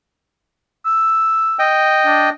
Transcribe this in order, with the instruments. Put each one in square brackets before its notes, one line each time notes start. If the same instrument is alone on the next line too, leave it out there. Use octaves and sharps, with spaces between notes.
[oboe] E6
[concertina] D#5 G5
[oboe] D4